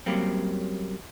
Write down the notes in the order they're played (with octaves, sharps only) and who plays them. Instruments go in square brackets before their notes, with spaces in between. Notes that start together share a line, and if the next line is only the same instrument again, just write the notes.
[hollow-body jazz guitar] F#2 F#3 G3 A#3 C4